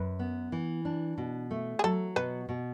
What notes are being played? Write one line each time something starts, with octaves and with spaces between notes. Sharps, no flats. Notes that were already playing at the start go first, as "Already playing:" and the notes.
Already playing: F#2 B4
B3
E3
D4
B2
A3
G#4
F#3 A4
B2 B4
B2